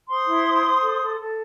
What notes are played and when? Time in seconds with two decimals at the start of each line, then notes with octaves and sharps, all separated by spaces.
0.10 C5 C6 D#6
0.28 E4
0.47 C5
0.65 C5
0.82 A4
1.01 A4
1.19 A4